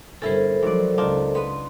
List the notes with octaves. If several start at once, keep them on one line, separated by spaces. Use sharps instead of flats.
G1 C#4 E4 A4 A#4 C5
G#2 F3 F#3 D5
C#2 D4 D#4 F4
B3 B4 C6